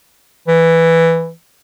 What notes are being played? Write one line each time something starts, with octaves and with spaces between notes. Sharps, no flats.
E3